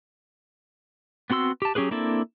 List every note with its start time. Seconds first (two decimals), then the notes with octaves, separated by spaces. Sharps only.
1.30 B3 C4 F#4 C6 E6
1.62 G4 A5
1.75 F#3 C#4 G4 G#4 B4
1.91 A#3 C4 D4 E4 A4